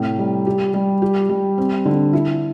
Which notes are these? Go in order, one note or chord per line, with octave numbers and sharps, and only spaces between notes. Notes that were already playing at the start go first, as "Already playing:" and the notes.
Already playing: A2 C3
G3
G4
G3
G4
G3
C4
D3
E4